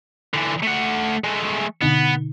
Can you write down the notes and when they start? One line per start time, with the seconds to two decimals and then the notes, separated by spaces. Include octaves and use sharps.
0.34 D3 E3
0.63 A3 F#5
1.24 G#3 A3
1.82 B2 D3 B3 D#4